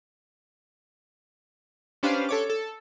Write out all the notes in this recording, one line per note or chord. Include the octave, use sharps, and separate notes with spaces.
C#4 D4 G4 B4 C5 F5
A4 C#5 D6
A4